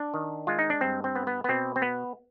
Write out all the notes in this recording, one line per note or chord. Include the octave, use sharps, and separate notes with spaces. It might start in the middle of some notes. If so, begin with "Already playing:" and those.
Already playing: D4
D#3
G#3 F4
D#4
D4
G2 C4
C4
B3
B3
B3
B2 C4
C4
B3